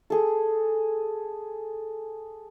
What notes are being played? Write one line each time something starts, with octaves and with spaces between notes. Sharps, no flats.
G#4 A4